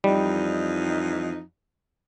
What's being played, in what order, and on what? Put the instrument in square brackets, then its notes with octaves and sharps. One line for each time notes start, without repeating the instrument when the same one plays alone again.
[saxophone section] F2 E3 D#4 [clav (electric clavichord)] G3